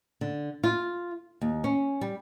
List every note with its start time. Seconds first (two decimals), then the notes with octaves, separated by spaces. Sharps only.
0.21 D3
0.64 F4
1.41 D#2
1.64 C#4
2.01 G3